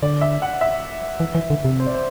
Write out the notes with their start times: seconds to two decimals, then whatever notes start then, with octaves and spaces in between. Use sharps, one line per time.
0.02 D3 D5
0.21 E5
0.42 F#5
0.61 E5
1.20 E3
1.35 E3
1.50 D3
1.65 C3
1.80 C5
1.86 D5
1.94 C5